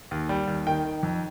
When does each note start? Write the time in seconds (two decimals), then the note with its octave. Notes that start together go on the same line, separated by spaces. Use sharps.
0.11 D#2
0.29 G3
0.48 D#2
0.67 D#3 G5
0.85 D#3
1.03 F2